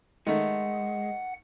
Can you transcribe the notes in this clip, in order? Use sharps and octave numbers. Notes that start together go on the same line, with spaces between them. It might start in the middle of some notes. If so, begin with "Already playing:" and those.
D#3 G#3 A3 D#5 F#5